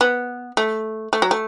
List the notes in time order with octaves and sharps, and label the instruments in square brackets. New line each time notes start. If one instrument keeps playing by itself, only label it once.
[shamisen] B3
A3
A3
F#3
A3